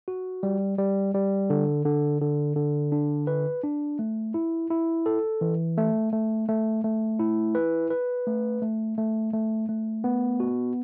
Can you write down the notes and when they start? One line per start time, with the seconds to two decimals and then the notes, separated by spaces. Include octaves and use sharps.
0.08 F#4
0.43 G3
0.78 G3
1.14 G3
1.50 D3
1.85 D3
2.21 D3
2.56 D3
2.92 D4
3.27 B4
3.64 D4
3.99 A3
4.34 E4
4.70 E4
5.06 A4
5.41 E3
5.77 A3
6.13 A3
6.49 A3
6.84 A3
7.20 E4
7.55 B4
7.90 B4
8.27 A3
8.62 A3
8.98 A3
9.33 A3
9.69 A3
10.04 B3
10.40 F#4